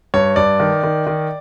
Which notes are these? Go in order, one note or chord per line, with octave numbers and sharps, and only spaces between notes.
G2 C#5
G2 D5
D#3
D#3
D#3